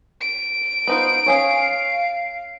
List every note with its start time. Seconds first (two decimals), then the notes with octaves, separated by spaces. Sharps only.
0.21 D7
0.87 B3 D#4 F4 C5
1.26 C#4 G#4 C#5 F5